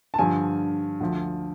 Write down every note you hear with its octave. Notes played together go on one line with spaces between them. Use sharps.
A5
G2 D3 F3 G#5
D2 D3 F3